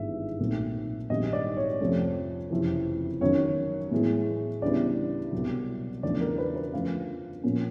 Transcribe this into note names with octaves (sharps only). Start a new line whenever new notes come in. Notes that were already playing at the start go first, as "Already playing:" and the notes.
Already playing: G#1 G2 E3 G#3 B3 E5
B1 A#2 F#3 A3 C4
A#1 G#2 D#3 G3 C4 D#5
D5
C#5
F2 C3 F3 A3 C#4
F#1 F2 C3 E3
F#2 D#3 F#3 C#5
A2 E3 G#3 B3 E4
D2 C#3 E3 G3 B3 D5
C2 B2 F#3
E2 C#3 F3 A3 D4 D5
A#4
B4
B4
F#2 D3 F3 A3 F5
A#2 F3 A#3 C#4